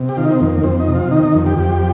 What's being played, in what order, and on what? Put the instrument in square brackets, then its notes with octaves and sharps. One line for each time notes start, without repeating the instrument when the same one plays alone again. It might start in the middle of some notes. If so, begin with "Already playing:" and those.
Already playing: [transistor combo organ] C3
G4
D#3 F4
D#4
C4
F2 A#3
F2 C4
D#4
C3
F4
D#3 D#4
D#4
F2
G4
F2 G4